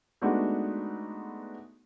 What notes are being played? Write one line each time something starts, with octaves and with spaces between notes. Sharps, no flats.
G#3 A3 B3 D4 D#4 F#4